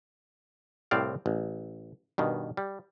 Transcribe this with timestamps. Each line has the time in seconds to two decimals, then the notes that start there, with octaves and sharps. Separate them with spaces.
0.91 C2 A2 C4 D5 F5
1.26 A1
2.18 G2 B2 D#3
2.57 G3